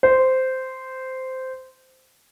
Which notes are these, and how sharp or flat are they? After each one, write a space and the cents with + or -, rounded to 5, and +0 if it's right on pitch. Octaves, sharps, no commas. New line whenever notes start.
C5 -10